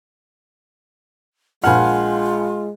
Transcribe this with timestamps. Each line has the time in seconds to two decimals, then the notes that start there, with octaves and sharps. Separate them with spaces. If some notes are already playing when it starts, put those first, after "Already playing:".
1.64 A#1 G#3 F4 F#5 G#5 F6